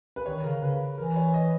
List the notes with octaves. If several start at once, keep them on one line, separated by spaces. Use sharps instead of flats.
B4
D#3 C#5
C#3 A#4
C#3 B4
E3 A#4
C#5
D#5